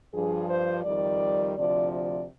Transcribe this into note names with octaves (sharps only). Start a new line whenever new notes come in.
G2 F3 G#4
C5
F2 D#3 G3 D5
D2 C3 F3 D5
D5